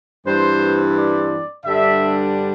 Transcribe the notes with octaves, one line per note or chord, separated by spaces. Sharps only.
G2 E3 G3 C4 C5
D5
G2 D3 G3 D4 E5